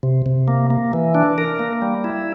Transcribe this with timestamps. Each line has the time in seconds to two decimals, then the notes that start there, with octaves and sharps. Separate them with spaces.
0.03 C3
0.26 C3
0.48 A#3
0.70 A#3
0.93 E3
1.15 D4
1.38 A#4
1.59 A#3
1.82 G3
2.04 E4